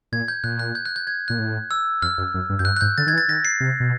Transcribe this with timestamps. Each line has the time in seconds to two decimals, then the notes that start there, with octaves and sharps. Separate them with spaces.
0.12 A#2 G#6
0.28 G6
0.44 A#2 F#6
0.59 F#6
0.75 G6
0.85 F#6
0.96 G6
1.07 G#6
1.28 A#2 F#6
1.39 A2
1.71 E6
2.02 F2 F6
2.18 F#2
2.34 F#2
2.50 G2
2.59 F#2 G6
2.65 G2 F#6
2.76 F#6
2.81 G#2 G6
2.98 D3 A6
3.07 D#3 G#6
3.13 E3
3.18 A6
3.28 D#3 A#6
3.45 C7
3.60 C3
3.80 B2